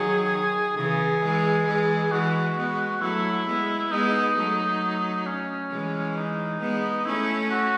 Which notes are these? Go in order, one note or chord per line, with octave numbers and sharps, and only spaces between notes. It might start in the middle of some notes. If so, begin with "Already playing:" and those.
Already playing: D#3 F#3 G#4
D#3
C#3 E3 G#4
E3 G#3
E3 G#3
E3 G#3 F#4
G#3 B3
F#3 A3 E4
G#3 B3
G#3 B3 D#4
F#3 A3
C#4
E3 G#3
D#4
G#3 B3
A3 C#4 E4
F#4